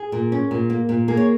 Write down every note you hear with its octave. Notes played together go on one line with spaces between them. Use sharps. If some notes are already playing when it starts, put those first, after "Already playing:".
Already playing: G#4
A#2
C#4
A#2
A#3
A#2
A#3 G#4
C#5